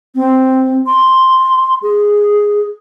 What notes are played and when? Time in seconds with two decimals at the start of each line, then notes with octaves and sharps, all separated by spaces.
0.15 C4
0.87 C6
1.82 G#4